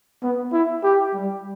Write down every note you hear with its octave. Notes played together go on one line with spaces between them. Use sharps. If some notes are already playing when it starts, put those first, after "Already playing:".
B3
E4
G4
G3